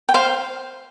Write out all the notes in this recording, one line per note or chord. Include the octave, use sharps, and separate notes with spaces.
G5
C5 F5